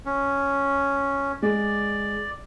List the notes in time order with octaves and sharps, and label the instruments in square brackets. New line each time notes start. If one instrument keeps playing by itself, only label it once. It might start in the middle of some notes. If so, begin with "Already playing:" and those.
[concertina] C#4
[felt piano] G#3 [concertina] D5